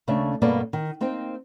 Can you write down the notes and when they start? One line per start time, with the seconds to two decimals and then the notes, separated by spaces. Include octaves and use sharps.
0.07 D#2 C#3 A3 C#4 D4 E5
0.42 G2 B2 A#3 B3 A4 D5
0.73 D#3
1.01 A#3 C4 D#4 C5 G5